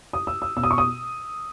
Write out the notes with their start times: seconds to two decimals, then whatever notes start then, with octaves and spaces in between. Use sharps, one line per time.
0.13 D#6
0.27 E6
0.42 E6
0.57 B2 E6
0.63 D#6
0.71 C#6
0.78 D#6